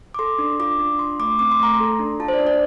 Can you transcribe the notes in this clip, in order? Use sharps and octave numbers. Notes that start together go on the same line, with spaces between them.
D6
A4 C6
D4
F4 D6
D4
F4 C6
A3 D6
C4 D6
C6
A3 A#5
C6
A4
D4
F4 A5
C5
D5
D4
D5